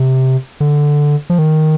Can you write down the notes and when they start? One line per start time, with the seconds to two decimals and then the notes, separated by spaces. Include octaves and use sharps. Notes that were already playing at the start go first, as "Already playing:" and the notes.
Already playing: C3
0.60 D3
1.30 F3
1.39 D#3